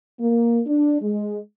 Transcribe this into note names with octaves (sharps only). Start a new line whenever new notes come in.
A#3
D4
G#3